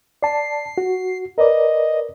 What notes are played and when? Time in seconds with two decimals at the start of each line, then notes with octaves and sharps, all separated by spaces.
0.23 D5 A5 C7
0.78 F#4
1.38 A#4 B4 D5 D#5